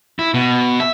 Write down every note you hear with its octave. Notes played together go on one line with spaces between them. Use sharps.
E4
B2
E5